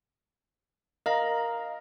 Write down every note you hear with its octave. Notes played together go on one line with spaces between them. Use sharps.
A#4 D#5 F5